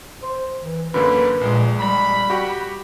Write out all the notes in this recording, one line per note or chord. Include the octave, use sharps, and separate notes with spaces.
C5
E3
F#2 D3 A#3 B4
A#1 A#2 G#3
G3 B5
F#4 G4 F#5